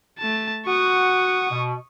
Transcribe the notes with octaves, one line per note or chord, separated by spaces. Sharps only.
A3 A5
F#4 F#5 C#6 D#6
B2